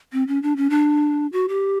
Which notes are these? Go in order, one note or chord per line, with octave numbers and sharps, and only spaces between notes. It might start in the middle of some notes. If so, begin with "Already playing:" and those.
C4
C#4
D4
C#4
D4
F#4
G4